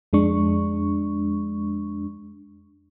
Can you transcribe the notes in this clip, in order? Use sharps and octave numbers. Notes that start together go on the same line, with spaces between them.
F2 G#3 D4 C#6